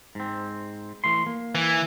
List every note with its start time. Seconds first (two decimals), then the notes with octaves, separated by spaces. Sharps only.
0.15 G#2 C4
1.04 E3 A3 C6
1.26 A#3
1.55 E3